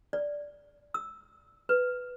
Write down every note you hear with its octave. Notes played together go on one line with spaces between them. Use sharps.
D5
E6
B4